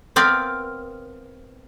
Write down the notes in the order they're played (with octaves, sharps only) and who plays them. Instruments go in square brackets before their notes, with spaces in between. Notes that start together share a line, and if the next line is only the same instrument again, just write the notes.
[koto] B3 C4 A#4 D5 F5